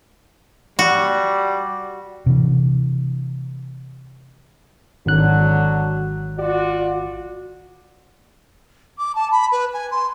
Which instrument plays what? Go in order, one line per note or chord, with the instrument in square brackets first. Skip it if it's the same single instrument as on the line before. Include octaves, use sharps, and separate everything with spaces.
[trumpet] G3 [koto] F#4
[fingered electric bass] C3 E3
[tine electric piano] G#1 F#6 [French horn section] D3 F#3
[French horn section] F4 F#4 D5
[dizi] D6
A5
B5
B4
G#5
C6